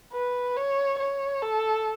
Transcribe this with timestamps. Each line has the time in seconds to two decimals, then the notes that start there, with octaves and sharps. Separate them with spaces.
0.13 B4
0.57 C#5
0.99 C#5
1.42 A4